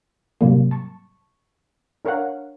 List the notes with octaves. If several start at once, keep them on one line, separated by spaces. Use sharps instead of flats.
G#2 C3 F#3 G3 A#3
A5 C#6
D4 A#4 C#5 F5 F#5